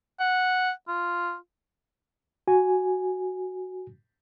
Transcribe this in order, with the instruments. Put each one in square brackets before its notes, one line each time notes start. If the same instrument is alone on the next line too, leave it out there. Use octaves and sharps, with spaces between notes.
[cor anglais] F#5
F4
[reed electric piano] F#4 G#5